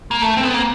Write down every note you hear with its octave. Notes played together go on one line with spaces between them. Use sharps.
A#3
A3
C4
B3
A#3